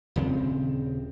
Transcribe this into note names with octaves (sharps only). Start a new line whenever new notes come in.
D#1 C#3 C4